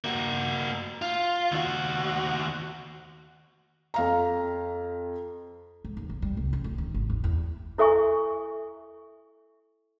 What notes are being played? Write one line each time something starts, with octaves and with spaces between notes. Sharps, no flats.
A#3 F#4
F4
D#2 F#4
F2 F5 A#5
G#2
D#2
G1
G3
C2
C#4
D1
D#3
G#1
D#2
E2
E4 A4 E5 G#5 C#6